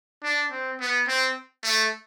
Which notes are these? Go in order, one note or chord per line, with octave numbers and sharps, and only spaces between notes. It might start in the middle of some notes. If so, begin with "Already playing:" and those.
D4
C4
B3
C4
A3